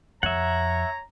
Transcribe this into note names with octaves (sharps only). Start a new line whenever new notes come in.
F2 C#5 E5 F#5 A#5